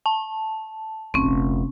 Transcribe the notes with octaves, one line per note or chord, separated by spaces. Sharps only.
A5
F1 A#1 C4 C#4